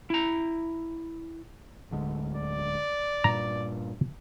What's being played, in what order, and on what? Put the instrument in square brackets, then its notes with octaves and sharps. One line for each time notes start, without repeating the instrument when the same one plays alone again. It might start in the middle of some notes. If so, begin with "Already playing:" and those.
[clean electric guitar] E4 A#5
[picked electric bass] D1 D3 G#3
[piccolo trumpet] D5
[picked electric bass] G2 A#2 [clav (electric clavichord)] A#5